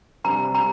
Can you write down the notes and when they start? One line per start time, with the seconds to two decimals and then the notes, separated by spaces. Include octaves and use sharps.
0.24 C3 G3 D4 G4 A#5
0.54 C3 G3 D4 G4 A#5